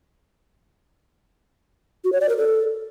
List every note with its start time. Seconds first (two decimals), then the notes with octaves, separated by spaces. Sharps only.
2.04 F#4
2.13 C#5
2.21 D5
2.29 A#4
2.37 A4